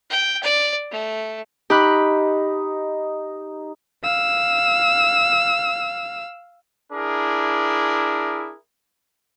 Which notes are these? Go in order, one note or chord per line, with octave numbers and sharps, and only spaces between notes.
G5
D5
A3
D#4 G4 B5 F#6
F5 E6
D4 E4 G#4 A#4